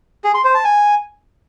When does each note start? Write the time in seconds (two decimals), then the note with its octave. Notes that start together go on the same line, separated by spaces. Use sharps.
0.24 G#4
0.34 C6
0.44 C5
0.54 A5
0.65 G#5